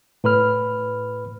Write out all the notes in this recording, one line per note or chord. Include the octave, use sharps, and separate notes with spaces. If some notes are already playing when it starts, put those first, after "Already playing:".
A2 B4 B5 F6